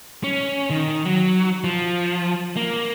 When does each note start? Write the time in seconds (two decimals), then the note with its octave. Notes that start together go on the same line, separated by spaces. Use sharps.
0.24 C#4
0.70 D#3
1.05 F#3
1.64 F3
2.56 A#3